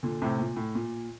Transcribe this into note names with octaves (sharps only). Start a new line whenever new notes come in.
A#2 D3
A2 C3
A#2
A2
A#2